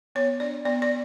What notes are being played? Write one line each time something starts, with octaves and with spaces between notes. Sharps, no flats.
B3 C#5
D4 D5
B3 D5
D5